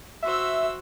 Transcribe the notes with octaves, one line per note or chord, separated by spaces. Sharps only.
F#4 C5 E5 E6